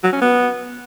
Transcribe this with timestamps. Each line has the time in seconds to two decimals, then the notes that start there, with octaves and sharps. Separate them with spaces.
0.04 F#3
0.13 C#4
0.22 B3